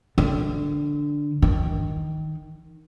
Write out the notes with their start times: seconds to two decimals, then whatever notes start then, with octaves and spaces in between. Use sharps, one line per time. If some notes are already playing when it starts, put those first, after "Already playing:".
0.18 D3
1.42 D#3